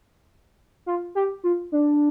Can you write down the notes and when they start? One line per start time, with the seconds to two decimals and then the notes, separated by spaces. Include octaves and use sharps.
0.86 F4
1.15 G4
1.44 F4
1.72 D4